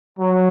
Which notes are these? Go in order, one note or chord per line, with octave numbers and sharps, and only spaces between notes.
F#3